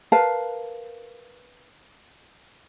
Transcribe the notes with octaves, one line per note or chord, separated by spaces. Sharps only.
A#4 B4 F5 A5